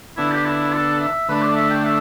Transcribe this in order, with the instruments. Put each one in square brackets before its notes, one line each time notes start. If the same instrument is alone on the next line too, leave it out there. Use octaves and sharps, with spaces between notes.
[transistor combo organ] D3 B3 D4 [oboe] E4
[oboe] G4
E4
A4
E5
[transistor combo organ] D3 A3 D4 [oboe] B4
[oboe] D5
E5
G5
E5